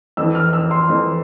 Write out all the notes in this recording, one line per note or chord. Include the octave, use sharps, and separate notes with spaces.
F2 E3 E6
F6
E6
C6
F2 E3